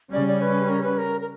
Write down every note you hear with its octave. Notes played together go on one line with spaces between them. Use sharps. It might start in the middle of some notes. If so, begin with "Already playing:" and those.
C#3 G3 C#4 D5
D5
B4
A#4
B4
A#4
A#4